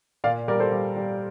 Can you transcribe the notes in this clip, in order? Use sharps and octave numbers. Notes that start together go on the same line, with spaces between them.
A#2 D5 F5
G3 A#4 D5
A4 C5
G3
G3